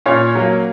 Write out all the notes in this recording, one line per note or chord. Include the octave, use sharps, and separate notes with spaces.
A#2 C#4 C#5
F#3 A#3